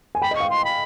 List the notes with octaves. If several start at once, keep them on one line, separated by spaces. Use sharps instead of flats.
G#5
G5 B5
D#5
F5 C#6
C6
B5